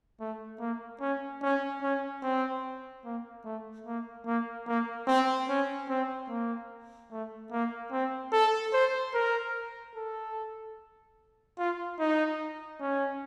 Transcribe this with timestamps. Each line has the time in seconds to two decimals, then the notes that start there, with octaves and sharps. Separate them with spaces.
0.20 A3
0.60 A#3
1.00 C#4
1.42 C#4
1.82 C#4
2.22 C4
3.05 A#3
3.44 A3
3.86 A#3
4.26 A#3
4.67 A#3
5.07 C4
5.48 C#4
5.89 C4
6.29 A#3
7.11 A3
7.51 A#3
7.92 C4
8.32 A4
8.73 C5
9.14 A#4
9.95 A4
11.58 F4
11.99 D#4
12.80 C#4